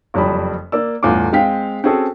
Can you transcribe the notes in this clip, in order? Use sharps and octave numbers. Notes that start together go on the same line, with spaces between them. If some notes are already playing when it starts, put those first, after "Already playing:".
F#1 F2 G3 B5
A#3 D5 E6
G1 E2 A2 F4 D6
G#3 C4 F5 G5 B6
C4 C#4 F#4 G#4 A4